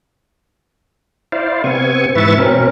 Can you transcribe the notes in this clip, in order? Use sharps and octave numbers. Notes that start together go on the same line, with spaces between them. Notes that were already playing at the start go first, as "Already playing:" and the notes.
E4 C5 D5 F5
C3 B3 C4 G#5 C#6
G#2 E3 B4 E5 C#6 A6
B2 C4 C#4 A#4